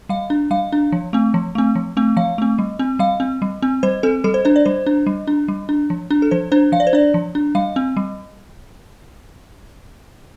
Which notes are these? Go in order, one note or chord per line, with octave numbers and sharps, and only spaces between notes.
G3 F5
D4
G3 F5
D4
F3
A3 C4
F3
A3 C4
F3
A3 C4
F3 F5
A3 C4
G3
C4
G3 F5
C4
G3
C4
G3 C5
C4 A4
G3 A4
C5
D4 C5
D5
G3 C5
D4
G3
D4
G3
D4
F3
D4
A4
F3 C5
D4 C5
F3 F5
D5
C5
D4 D5
F3
D4
G3 F5
C4
G3